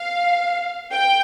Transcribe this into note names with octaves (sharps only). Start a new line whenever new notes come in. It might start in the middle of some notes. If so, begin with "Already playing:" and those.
Already playing: F5
G5